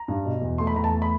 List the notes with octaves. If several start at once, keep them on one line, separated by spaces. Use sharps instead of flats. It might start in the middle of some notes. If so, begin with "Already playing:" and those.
Already playing: A#5
G2
B2
E2
A3 C6
B5
E2 A#5
A5
A3
B5